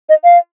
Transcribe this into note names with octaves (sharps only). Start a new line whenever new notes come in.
D#5
F5